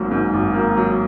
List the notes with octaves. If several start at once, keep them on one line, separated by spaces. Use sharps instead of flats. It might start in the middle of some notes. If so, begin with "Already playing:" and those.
Already playing: G#1 G#2 F#3 A#3
G#2
G#1
A#3
F#3